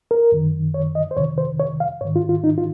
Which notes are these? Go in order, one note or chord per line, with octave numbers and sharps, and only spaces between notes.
A#4
F#2 D#3
C#5
D#5
C5
F2 C3 D#3 C#5
C5
C#5
F5
G#2 D#3 C#5
F4
F4
D#4
F4